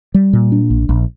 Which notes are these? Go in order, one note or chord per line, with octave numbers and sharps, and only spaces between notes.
G3
A#2
D4
A#1
A#1